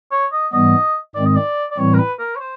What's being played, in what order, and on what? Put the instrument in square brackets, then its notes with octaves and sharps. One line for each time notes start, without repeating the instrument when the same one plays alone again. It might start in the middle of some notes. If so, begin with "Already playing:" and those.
[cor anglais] C#5
D#5
[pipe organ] G#2 E3 G3 B3 [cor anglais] D#5
[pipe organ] G#2 D#3 G#3 C4 [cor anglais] D5
[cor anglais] D#5
D5
D5
[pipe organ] A2 E3 G3 C4 [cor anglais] C#5
[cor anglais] A#4
B4
A#4
C#5
C5